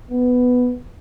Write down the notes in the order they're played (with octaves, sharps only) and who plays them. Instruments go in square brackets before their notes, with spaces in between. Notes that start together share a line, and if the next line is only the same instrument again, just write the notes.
[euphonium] B3